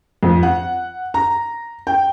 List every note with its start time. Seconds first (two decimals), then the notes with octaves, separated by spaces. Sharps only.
0.23 F2
0.43 F#5
1.14 A#5
1.87 G5